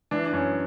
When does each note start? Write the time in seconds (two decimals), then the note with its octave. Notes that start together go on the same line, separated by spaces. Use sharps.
0.11 E3 D4
0.25 D4
0.33 F#2 C#4